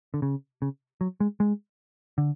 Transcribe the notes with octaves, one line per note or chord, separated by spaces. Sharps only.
D3
C#3
C#3
F#3
G#3
G#3
D3